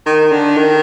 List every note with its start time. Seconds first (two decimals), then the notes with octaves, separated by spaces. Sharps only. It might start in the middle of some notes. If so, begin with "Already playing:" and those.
0.06 D#3
0.31 D3
0.57 D#3